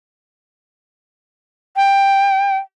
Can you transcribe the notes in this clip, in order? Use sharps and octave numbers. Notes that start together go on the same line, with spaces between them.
G5